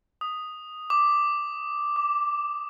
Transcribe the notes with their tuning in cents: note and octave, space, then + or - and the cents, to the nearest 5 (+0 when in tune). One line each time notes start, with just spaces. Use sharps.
D#6 -5
D6 +0
D6 -25